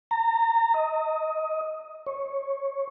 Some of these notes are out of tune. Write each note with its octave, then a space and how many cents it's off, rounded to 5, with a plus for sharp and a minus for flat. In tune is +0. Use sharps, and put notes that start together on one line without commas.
A#5 -30
D#5 +15
C#5 -15